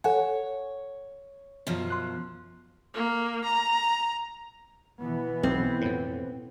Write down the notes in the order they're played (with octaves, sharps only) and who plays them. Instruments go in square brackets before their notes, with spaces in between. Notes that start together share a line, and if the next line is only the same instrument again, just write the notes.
[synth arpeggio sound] A4 F#5 G#5 [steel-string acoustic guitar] C#5
[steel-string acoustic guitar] F#2 B2 F3
[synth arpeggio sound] C6 F#6
[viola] A#3
A#5
[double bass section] B2 E3 B3
[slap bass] B1 [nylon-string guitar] C4
[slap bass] F2 A2